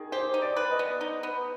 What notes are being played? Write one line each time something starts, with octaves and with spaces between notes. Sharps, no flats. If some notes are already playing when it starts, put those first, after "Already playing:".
Already playing: D#3 G#4
G4 C5
D#4
D5
B4
D#5
B3
D#4
B3